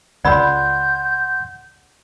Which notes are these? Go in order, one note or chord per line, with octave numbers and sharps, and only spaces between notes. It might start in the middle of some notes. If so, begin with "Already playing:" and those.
C#2 D5 F#5 B5 C6 E6 G6